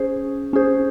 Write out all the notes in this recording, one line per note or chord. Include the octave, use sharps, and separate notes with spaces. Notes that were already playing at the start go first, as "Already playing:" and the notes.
Already playing: C#4 G#4 C5
C#4 G#4 C5